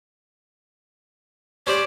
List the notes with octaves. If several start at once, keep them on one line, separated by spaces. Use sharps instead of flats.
C#4 G4 C5 D5